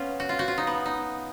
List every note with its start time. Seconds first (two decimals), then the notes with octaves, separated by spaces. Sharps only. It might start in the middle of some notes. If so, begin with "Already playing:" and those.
Already playing: B3 C#4 F4
0.20 F#4
0.29 F4
0.39 F#4
0.48 F4
0.58 D#4
0.67 B3
0.86 D#4